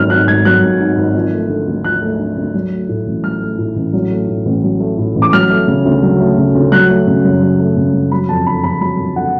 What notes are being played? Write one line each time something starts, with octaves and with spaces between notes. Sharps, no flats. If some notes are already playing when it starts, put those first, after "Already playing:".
Already playing: G#1 F#3 F6
G#2 F#6
G#1 G#6
F#3 F#6
G#1
G#2
G#1
F3
A3
D3
D2
F3 F#6
A3
D3
D2
F#3
A3
A2
A1
F#3 F6
A3
A2
A1
F#3
A3
A2
A1
F#3
A3
A2
A1
D6
F#3 F6
A3
C#3
D2
F#3
A3
C#3
D2
F#3 F#6
A3
C#3
F#2
F#3
A3
C#3
F#2
F#3 B5
F2 A5
D3 B5
F2 B5
F#3 B5
F2
D3 F#5